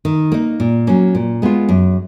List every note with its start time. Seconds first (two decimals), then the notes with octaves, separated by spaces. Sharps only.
0.05 D#3
0.32 A#3 D#4
0.60 A#2
0.87 F#3 A#3 C#4
1.15 A#2
1.42 G#3 B3 F4
1.69 F#2